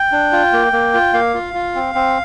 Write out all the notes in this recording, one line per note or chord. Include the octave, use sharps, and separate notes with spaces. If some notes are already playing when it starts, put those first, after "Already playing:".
Already playing: G5
D4
F4
A#3
A#3
F4
A#3 F5
F4
F4
C4
C4